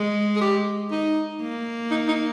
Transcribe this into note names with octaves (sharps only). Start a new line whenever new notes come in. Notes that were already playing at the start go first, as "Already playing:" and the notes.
Already playing: G#3
G#4
G4
D#4
A#3
D#4
D#4